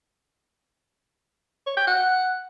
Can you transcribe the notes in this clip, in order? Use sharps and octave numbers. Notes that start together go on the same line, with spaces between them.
C#5
G5
F#5